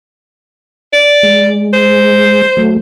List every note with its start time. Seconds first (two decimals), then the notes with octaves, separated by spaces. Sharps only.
0.93 D5
1.23 G#3
1.73 C5
2.57 F#3 A3